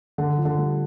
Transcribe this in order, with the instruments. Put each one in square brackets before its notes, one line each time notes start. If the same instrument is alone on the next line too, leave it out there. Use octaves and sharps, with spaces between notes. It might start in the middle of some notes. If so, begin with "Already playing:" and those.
[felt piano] D3
[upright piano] F3
[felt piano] D3
[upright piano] G3